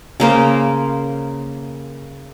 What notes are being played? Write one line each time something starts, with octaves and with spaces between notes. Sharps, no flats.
C#3 A#3 C5